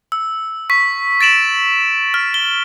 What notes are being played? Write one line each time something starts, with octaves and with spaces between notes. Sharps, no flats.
E6
C#6 B6
A6 D7 E7 F#7
F6
G7